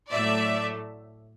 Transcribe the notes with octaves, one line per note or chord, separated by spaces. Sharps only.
A2 F#3 A3 D5 E5